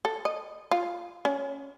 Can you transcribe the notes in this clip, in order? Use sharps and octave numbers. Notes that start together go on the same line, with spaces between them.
A4
D#5
F4
C#4